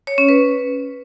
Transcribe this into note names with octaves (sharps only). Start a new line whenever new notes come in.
C#5
C#4
B4